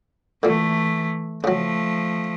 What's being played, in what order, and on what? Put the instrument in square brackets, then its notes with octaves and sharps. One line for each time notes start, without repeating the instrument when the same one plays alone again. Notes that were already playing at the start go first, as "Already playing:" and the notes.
[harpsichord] A#2 D3 [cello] E3 A3
[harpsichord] C#3 F#3 [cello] F3 A3